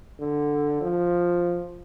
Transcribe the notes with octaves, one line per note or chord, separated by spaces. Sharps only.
D3
F3